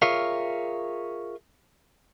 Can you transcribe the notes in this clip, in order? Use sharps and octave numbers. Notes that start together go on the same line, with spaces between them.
F4 G#4 A#4 C#5 E5 F5